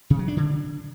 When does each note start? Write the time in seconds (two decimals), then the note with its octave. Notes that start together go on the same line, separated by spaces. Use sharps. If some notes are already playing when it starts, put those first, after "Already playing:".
0.10 C3
0.19 F#3
0.28 D4
0.37 D3